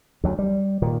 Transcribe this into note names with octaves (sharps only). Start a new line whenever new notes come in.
D2 F#3
G3
A#2 D#3